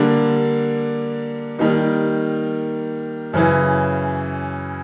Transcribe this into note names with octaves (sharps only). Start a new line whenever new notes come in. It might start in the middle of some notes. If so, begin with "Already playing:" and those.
Already playing: D3 G3 A#3 D4
D#3 G3 A#3 D#4
F#2 C#3 E3